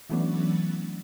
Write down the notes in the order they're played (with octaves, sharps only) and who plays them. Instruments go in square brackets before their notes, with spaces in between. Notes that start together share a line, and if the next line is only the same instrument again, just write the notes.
[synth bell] E3 F#3 A3 B3 C#4 D4